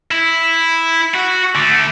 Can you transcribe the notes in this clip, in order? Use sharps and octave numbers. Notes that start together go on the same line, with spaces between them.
E4
F#4
D3 A3